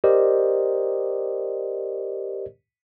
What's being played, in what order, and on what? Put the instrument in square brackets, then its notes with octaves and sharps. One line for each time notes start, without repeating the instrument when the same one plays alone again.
[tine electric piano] G4 A#4 C5 D5 D#5